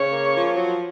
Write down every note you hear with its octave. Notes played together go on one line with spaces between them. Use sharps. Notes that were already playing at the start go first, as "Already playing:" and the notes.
Already playing: C#3 C#5
A#3
F3
F#3